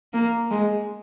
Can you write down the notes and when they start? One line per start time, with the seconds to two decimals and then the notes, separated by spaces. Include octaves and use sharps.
0.14 A#3
0.51 G#3